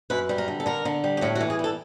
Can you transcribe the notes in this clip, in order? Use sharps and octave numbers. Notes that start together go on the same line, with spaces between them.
F#2 B4
G3
A#4
D3
A4
D3 A#4
D3
G3
G4
A2 F#4
F#4
E3
G#4
G3 A4